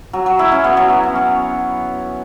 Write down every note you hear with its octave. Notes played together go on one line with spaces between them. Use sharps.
F#3
F#3
E4
C#4
B3
F#3
B3
C#4
C#4